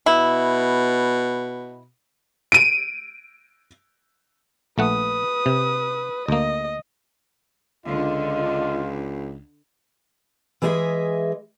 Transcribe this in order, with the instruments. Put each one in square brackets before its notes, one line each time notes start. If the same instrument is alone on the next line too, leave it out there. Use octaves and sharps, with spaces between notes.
[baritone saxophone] B2 [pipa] E4
[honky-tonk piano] D7 D#7
[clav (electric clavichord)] A#1 A3 F#5 [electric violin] B4 D#6
[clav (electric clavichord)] C3
[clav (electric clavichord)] D2 A#3 [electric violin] D#5
[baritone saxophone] C#2 [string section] D3 [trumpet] F4 [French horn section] D#5
[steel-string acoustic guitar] E3 G#3 G#4 C5 D#5 E5